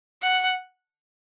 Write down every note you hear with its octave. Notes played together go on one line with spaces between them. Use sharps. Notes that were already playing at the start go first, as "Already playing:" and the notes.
F#5